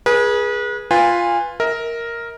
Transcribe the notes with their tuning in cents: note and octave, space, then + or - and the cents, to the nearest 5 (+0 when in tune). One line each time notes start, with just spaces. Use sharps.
G#4 +0 B4 -35
F4 +0 B4 +0 G#5 -25
A#4 +0 E5 -45